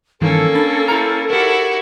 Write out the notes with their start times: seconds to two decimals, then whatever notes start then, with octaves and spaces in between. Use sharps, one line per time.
0.21 G2 D#3 E3 A#3 C#4 A4
0.55 D4 B5 A6
0.88 E4 A#5 F6 A6
1.30 E4 F#4 G4 A#4